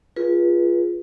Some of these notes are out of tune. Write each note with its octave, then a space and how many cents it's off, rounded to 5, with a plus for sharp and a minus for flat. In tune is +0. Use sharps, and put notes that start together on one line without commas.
F4 +0 G#4 +0 B4 -30